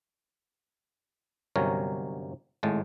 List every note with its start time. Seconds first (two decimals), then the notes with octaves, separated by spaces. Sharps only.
1.56 G1 C3 F#3 C#4 A#4 C#5
2.63 G#1 A2 G#3 A5